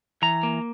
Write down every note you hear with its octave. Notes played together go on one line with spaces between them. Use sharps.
E3 A#5
A#3